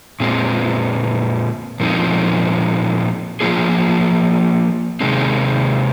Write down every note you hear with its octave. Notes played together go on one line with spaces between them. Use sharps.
A#2 G#3 C4
A#2 F3 G#3 C4 D#4
F3 A#3 F4 G#4
C3 D#3 G#3 C4